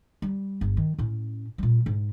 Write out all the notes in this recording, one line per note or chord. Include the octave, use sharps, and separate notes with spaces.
G3
G1
D#3
A2 C#4
A#2 G3
G#2